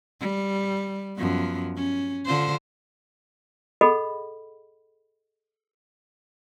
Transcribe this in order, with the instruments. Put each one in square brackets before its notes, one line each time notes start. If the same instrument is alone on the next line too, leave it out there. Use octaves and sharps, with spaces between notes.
[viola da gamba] G3
F#2 F3 B3
C#4
D3 F4 C5
[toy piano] G#4 A4 D#5 F#5 B5